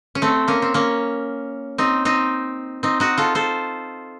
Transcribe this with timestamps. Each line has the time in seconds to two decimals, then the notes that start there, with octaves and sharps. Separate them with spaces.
0.15 C#4
0.22 A3 C4
0.48 A#3 C#4
0.62 C4
0.74 A#3 C#4
1.78 C4 D#4
2.05 C4 D#4
2.83 C4 D#4
3.00 D#4 F#4
3.18 F4 A4
3.35 A4 C5